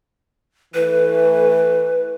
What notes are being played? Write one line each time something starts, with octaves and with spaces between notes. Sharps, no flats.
E3 A3 B4